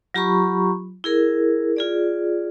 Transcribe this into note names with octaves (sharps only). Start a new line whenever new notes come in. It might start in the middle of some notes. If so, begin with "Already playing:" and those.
F#3 F4 G4 A#5 B5 C#6
E4 G#4 A#4
F4 G#4 D5